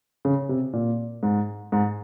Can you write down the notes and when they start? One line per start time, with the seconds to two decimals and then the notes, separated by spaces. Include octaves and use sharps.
0.25 C#3
0.49 C3
0.73 A#2
1.23 G#2
1.72 G#2